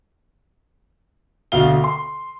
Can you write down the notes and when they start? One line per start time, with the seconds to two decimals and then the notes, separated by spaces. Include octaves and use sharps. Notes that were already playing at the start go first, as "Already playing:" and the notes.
1.52 D2 B2 F5 G7
1.84 C6